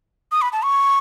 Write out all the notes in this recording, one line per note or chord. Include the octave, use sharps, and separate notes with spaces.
D#6
B5
A5
C#6